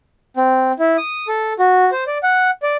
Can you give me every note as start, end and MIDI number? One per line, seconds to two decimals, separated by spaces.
0.37 0.72 60
0.79 0.97 64
0.98 1.27 87
1.28 1.53 69
1.59 1.90 66
1.92 2.04 72
2.07 2.18 74
2.23 2.50 78
2.63 2.77 74